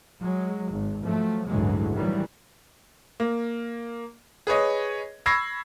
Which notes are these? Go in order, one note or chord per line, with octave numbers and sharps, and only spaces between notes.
F#3 G#3
G#1
F3 F#3 A3
A1 D2 G2 E3 F#3 G#3
D#3 E3 F#3 G3
A#3
G#4 B4 C#5 D#5
B5 C#6 E6 G#6 A#6 C7